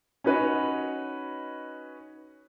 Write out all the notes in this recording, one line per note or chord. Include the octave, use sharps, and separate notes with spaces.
C#4 D#4 F#4 B4 C#5 D#5